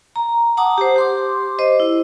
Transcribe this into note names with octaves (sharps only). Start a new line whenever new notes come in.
A#5
F#5 A5 A#5 D6 D#6
G4 C5
G4 C6 D6
C5 D#5
E4